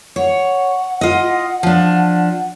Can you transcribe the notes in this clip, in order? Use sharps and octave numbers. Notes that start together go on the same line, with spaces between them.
C#5 F#5
F4 D#5
F3 D4